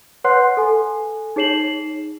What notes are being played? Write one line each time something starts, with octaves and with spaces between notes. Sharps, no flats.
B4 C#5 F#5 C6 F#6 C7
A4 G#5
D#4 G#4 C#5 C7 E7 F#7